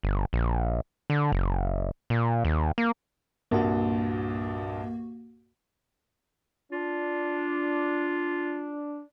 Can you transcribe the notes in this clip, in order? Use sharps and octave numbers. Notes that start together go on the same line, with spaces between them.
G1
A#1
D3
F#1
A#2
D#2
A#3
C2 G2 A#2 A#3 F#4
D4 F4